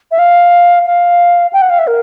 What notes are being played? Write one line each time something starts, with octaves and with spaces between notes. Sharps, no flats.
E5
F5
F5
G5
F#5
F5
E5
A#4